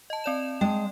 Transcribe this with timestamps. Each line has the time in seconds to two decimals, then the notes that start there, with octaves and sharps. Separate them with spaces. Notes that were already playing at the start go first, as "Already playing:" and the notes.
0.10 D#5 A5
0.24 C4 D5 E7
0.61 G#3 G5 A5